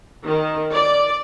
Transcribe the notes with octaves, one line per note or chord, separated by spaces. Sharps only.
D#3
D5